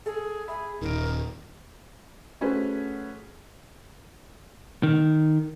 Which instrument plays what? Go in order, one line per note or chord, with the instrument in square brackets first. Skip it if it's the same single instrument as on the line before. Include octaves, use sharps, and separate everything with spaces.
[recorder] G#4 [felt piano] A4
[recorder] G#4 [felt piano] E5 B5
[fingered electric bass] D#1 [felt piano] D#3 D#4 D7 [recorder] A#4
[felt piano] A3 C#4 F#4 G#4 B4 C5
[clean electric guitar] D#3